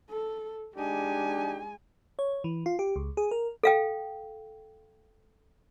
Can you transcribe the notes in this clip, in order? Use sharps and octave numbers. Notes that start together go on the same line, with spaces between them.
A4
G#3 D4 D#4 G4 G#5
C#5
E3
F4
G4
C#2
G#4
A#4
A4 F5 G5